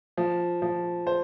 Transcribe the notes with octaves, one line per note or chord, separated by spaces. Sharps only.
F3
F3
C5